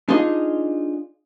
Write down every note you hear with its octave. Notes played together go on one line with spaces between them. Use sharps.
D4 D#4 F4 G#4 D#5